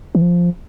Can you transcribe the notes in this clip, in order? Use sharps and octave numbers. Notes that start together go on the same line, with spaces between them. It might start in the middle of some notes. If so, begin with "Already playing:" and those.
E3
F3